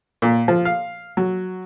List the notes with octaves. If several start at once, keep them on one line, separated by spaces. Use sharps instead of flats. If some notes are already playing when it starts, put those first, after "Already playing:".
A#2
F3
F5
F#3